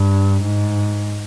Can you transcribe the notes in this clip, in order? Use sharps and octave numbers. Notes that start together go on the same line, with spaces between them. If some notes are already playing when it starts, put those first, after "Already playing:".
Already playing: G2
G#2